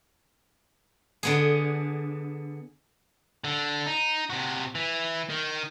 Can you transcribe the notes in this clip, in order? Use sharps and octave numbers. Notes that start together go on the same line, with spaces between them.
D3 B3 G#4
D3
D#4
C3 F#4
E3
D#3